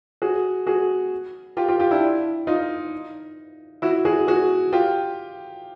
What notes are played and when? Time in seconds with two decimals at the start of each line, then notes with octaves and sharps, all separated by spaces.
0.22 F#4 G#4
0.67 F#4 G#4
1.57 F4 G4
1.68 F4 G4
1.79 F4 G4
1.91 D4 E4
2.47 D#4 F4
3.82 E4 F#4
4.05 F#4 G#4
4.27 F#4 G#4
4.72 F4 G4